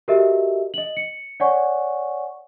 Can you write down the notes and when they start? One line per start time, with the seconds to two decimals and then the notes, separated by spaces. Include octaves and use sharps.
0.08 F#4 G4 A4 A#4 D#5 E5
0.74 D#5 F#7
0.97 C#7
1.40 C#5 D5 F#5 G#5 C#6